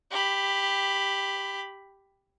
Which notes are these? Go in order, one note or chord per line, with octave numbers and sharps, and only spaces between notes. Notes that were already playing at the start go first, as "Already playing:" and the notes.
G4 B5